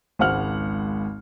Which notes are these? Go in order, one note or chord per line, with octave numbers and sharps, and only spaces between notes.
G#1 C#2 C5 F#5 F6 F#7